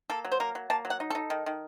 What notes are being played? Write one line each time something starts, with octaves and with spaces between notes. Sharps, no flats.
A#3 A4
F#3
C5
A#3 A#4
F#3
A#3 A5
F#3
F#5
D#4
D#4 A4
D#3
D#3